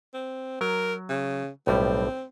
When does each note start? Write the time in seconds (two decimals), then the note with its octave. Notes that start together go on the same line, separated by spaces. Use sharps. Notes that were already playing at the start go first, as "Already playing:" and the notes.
0.14 C4
0.61 F#3 A#4
1.09 C#3
1.67 B1 A2 G3 C4